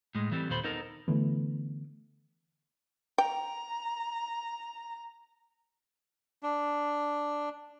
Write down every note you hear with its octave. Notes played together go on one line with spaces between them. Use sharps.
A2 G#3
E3 G3 C4 A4
D#2 A#2 A4 C5 B5
B3 D#4 A4 A#4
D3 E3 A3 B3
G5 A#5
D4